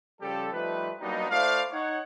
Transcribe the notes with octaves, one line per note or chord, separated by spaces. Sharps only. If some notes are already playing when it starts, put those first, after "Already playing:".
C#3 F3 G3 G4 A4
F3 G3 A3 D#4 B4
F#3 G3 A#3 B3 D4 D#4
A3 E4 C5 D5 F5
D#4 C#5 F#5